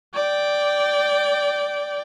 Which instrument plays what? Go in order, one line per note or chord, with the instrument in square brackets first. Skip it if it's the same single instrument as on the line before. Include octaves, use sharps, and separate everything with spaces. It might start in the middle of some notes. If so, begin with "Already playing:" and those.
[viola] D5 G5